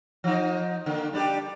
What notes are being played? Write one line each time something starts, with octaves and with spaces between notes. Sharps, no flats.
F3 D#4
D3 A#3
G3 D4 G4